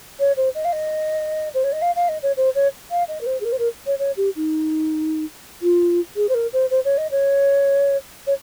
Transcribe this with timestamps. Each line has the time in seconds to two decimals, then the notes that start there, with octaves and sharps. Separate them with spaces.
0.19 C#5
0.36 C5
0.54 D#5
0.64 F5
0.72 D#5
1.54 C5
1.64 C#5
1.72 D#5
1.82 F5
1.95 F5
2.08 D#5
2.22 C#5
2.37 C5
2.55 C#5
2.90 F5
3.08 D#5
3.21 A#4
3.26 C5
3.40 G#4
3.44 A#4
3.52 C5
3.58 A#4
3.86 C#5
3.99 C#5
4.17 G4
4.36 D#4
5.62 F4
6.16 G#4
6.29 C5
6.34 A#4
6.53 C5
6.70 C5
6.84 C#5
6.97 D#5
7.11 C#5
8.27 C#5